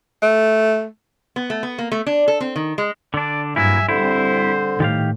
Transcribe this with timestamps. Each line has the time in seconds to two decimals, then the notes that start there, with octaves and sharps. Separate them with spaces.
0.22 A3
1.36 B3
1.50 A3
1.63 B3
1.79 A#3
1.92 A3
2.06 D4
2.28 A4
2.40 C4
2.56 D#3
2.78 G#3
3.14 D3 D4 D5
3.56 G2 F#3 A#3 E4 E5 G#5
3.89 D3 G3 C4 E4 C5
4.80 A2 D#3 G4 F5